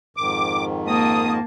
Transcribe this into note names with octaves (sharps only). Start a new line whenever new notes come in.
F2 G#2 D#3 D6
A#3 A5 D#6